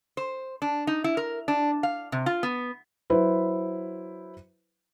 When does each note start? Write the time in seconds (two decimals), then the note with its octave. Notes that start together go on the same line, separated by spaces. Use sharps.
0.17 C5
0.62 D4
0.87 D#4
1.04 E4
1.17 A#4
1.48 D4
1.83 F5
2.12 C3
2.26 F4
2.43 B3
3.10 F#3 E4 B4 C5